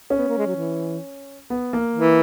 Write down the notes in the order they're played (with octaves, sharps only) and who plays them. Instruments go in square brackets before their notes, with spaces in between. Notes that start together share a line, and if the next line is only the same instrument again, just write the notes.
[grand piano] C#4
[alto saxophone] B3
A#3
G#3
F#3
E3
[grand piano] B3
A#3
[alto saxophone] E3